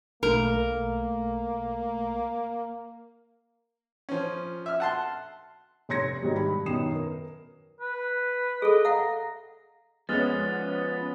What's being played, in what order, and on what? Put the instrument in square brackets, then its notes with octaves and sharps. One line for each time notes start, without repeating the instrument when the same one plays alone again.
[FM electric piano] B1 A3 [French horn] A#3 [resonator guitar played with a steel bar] A#4
[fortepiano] F3 C#4
E5 F6
F#5 A5 C6
[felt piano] F1 C#5 C6 G#6 A#6 C#7
G#2 D#3 F#3 G3
G2 B5
F#2 B2 D#3 D#6 C7 E7
A#4 B4
[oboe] B4
[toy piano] G#4 A4 [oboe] D#5
[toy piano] F5 F#5 [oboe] A#5
[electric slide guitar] F3 C#4 [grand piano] G#3 [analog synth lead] B3 [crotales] D#6 F6 A6